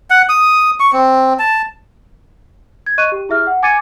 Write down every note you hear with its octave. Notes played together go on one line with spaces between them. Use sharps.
F#5
D#6
C#6
C4
A5
G#6
D#5 C#6 F#6 D#7
G4
E4 G#4 E5 F6
F#5
G#5 D6 G#6 A6 C#7 D#7